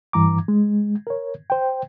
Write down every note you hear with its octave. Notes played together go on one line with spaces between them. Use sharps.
G2 E3 A#5 D6
G#3
A#4 C#5
C5 G5